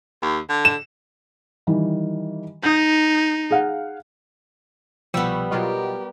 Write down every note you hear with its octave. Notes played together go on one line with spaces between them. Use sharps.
D#2
D3
E7
D#3 E3 G3
D#4 D#6 G6
G#4 F5 F#5
C2 B2 F3 G3 B3 G5 C#6 E6
B2 F#3 F4 G4 A#4 D#5